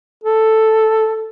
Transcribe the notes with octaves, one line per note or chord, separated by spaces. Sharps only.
A4